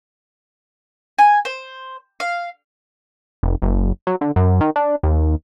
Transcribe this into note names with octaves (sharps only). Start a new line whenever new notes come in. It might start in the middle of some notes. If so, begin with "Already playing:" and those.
G#5
C5
F5
F1
F#1
F#3
D3
F#2
D#3
D4
D#2